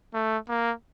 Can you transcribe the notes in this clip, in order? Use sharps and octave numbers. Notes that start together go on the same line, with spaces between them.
A3
A#3